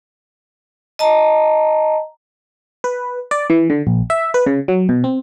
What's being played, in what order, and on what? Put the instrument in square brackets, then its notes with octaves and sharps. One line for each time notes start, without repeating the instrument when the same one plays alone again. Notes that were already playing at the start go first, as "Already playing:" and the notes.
[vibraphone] D#5 A5 A#5
[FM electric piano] B4
D5
E3
D3
A#1
E5
B4
C#3
F#3
B2
C4